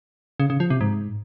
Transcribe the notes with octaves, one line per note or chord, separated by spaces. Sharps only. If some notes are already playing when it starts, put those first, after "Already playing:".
C#3
C#3
F3
C3
G#2